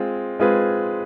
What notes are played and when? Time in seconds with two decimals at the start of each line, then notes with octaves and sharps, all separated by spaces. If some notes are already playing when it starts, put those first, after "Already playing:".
Already playing: G#3 C4 F4 G#4
0.39 G#3 C4 F4 G#4 B4